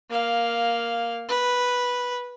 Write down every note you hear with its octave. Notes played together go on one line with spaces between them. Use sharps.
A#3 F5
B4